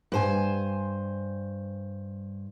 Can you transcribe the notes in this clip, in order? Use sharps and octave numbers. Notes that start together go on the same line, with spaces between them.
G2 C5 G#5